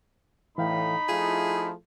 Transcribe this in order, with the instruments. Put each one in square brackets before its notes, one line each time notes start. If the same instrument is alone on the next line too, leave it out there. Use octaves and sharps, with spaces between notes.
[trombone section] A2 [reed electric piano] E3 F5 G5 [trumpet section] D#4 B5
[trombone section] F3 A3 E4 [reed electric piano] F4 [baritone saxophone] G#4